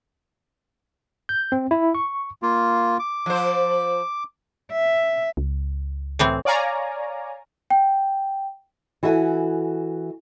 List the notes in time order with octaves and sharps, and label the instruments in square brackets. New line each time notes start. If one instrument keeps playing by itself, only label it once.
[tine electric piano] G6
C4
E4
C#6
[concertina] A#3 F4
D6
[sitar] F3 C5
[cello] E5
[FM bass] C#2
[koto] A2 E3 C4
[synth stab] C#5 D5 F5 G#5 A#5
[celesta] G5
[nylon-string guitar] E3 F#4 A4 E5 G5 G#5